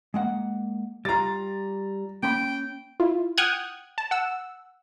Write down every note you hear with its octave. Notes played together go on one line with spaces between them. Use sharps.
G#3 A#3 F#5
G3 F4 A#5 A6
A#3 C#4 G5 B5
E4 F4
F#5 G5 D#6 F6 F#6 G#6
A5
F#5 E6